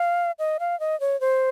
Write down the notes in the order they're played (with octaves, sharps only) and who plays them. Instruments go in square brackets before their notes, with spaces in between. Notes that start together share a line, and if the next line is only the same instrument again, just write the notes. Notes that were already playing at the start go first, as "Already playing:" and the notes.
Already playing: [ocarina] F5
D#5
F5
D#5
C#5
C5